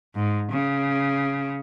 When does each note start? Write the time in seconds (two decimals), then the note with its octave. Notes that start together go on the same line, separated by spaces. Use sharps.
0.15 G#2
0.51 C#3